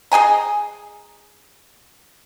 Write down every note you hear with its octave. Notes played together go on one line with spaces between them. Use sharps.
G#4 D#5 G#5 A#5